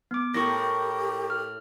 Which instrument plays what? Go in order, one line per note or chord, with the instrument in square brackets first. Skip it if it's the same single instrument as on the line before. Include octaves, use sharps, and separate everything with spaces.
[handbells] B3 D6
[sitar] A2 [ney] G4 [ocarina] A#4 [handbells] C#6 A#6
[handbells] F6